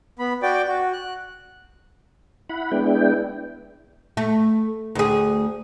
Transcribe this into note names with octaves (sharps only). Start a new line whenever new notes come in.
B3 B5
F#4 D5 G5 D6
F#4
F#6
E4 F#5 B5
G#3 B3 D4 E4 G5
A3
D2 G#4